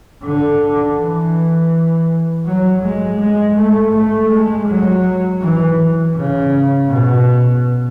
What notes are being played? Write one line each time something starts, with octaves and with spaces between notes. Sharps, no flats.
D3
E3
F#3
G#3
G#3
A3
A3
G#3
F#3
E3
C#3
B2